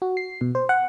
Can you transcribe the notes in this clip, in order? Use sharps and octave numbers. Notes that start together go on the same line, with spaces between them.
F#4
C7
B2
C5
F#5